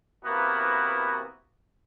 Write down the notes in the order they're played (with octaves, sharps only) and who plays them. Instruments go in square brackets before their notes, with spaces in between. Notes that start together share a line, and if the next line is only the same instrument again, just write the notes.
[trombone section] C3 E3 A#3 B3 E4 F#4